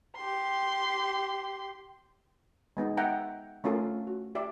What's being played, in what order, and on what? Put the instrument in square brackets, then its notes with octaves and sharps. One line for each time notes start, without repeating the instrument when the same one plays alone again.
[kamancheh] G4 C6
[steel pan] G#3 B3 D#4
E5 F#5 G5 A#5
A3 C#4 F4 A4 A#4
F#4
G4 D5 E5